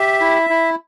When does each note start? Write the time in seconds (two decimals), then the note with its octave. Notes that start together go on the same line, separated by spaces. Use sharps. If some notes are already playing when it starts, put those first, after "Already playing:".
Already playing: G4 E5
0.20 E4
0.50 E4